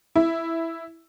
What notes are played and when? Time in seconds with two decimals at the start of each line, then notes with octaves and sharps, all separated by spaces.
0.16 E4